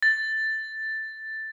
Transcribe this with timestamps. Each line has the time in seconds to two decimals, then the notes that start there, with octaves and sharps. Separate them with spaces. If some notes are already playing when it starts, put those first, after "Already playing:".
0.03 A6